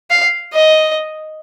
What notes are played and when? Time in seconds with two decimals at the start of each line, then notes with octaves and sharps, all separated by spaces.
0.10 F5
0.54 D#5